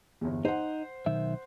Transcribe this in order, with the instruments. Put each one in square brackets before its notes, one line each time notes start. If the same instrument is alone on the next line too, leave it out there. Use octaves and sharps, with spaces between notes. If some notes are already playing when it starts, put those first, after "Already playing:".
[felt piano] G1 E2
[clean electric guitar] D#4 [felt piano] C5 F#5
[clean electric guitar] B1 D#3 E5